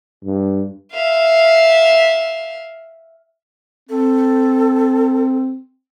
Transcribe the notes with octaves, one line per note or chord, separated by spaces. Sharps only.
G2
E5 F5
C4 A4